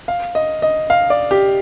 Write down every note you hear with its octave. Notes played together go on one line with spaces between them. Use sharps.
F5
D#5
D#5
F5
D5
G4